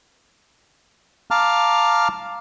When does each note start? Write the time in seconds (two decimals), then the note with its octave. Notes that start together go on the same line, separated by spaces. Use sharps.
1.31 F5 A5 A#5 D6 F6